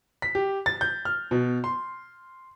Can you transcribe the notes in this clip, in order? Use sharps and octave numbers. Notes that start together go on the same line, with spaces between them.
B6
G4
A6
G6
F6
B2
C6